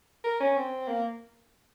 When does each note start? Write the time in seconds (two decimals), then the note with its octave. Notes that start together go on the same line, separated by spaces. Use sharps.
0.24 A#4
0.40 C#4
0.56 C4
0.88 A#3